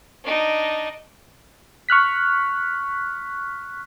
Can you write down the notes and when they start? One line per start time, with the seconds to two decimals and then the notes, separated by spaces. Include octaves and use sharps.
0.24 D4 D#4
1.89 C#6 F6 F#6 B6